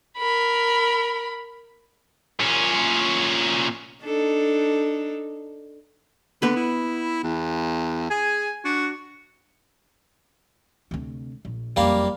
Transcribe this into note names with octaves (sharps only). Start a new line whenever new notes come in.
A#4 B5
A#2 C#4
D4 D#4 A4
D3 B3 B4
E4
E2
G#4 G#5
D4 F#4
D2 C3
A#1
F#1 F2 G3 A#3 F5